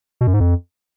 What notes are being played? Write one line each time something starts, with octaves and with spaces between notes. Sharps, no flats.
B2
F#2
G#2
F2